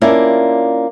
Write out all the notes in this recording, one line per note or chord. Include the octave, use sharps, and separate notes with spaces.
A#3 C#4 D4 E4 F4 D5